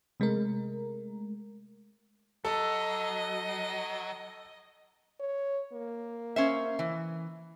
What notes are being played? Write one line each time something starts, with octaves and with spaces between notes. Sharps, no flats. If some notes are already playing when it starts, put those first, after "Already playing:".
C3 G#3 A3 A#4
F#3 A4 D#5
C#5
A#3
C#4 C5 E5
E3